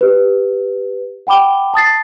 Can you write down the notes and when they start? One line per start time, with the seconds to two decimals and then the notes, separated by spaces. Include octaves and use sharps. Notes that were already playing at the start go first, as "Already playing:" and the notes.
0.01 G4 B4
1.27 F#5 G5 B5 D6 G7
1.74 A5 D#6 A6 C7